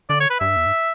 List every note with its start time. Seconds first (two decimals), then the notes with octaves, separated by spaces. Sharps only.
0.10 D3 D5
0.20 C#5
0.30 B4
0.40 G2 E5
0.57 E2
0.66 G2